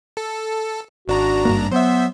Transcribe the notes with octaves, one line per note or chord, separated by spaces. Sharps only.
A4
G#1 D4 F#4 A#5
G2 A#3
F#3 B3 C5 E5